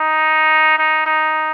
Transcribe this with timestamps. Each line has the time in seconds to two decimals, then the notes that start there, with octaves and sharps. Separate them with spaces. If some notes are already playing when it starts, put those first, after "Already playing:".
Already playing: D#4
0.78 D#4
1.06 D#4